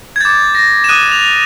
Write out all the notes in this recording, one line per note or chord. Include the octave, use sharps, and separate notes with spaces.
G#6
D6 G6 A6
A#6
E7
D#6 F#6 D#7
F7